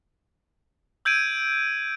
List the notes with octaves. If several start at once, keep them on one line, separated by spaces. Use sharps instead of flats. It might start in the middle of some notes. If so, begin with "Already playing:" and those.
E6 G6 G#6 D7 D#7